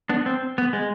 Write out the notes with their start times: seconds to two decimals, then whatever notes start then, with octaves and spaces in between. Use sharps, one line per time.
0.09 B3 D4
0.26 C4
0.58 B3
0.73 G#3